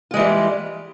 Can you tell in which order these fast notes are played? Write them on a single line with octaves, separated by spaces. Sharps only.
F4 G#3 E3 G3